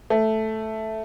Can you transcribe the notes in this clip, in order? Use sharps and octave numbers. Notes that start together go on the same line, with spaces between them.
A3